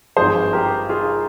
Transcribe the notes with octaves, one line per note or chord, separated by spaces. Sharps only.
G#1 G2 F3 G#4 C5
G4 A#4
F4 G#4